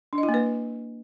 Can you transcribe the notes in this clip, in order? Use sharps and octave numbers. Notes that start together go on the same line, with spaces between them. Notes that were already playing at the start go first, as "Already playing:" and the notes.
D4
D#5
E4
A#3
B4